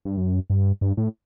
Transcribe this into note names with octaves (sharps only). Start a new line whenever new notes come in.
G2
F#2
G2
G2
A2